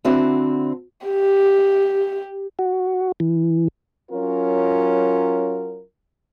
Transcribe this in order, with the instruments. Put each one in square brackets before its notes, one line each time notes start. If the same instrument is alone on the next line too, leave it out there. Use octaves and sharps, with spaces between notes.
[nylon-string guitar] D3 C4 D4 E4 F#4
[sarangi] G4
[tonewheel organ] F#4
E3
[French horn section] F#3 C#4 F4 A#4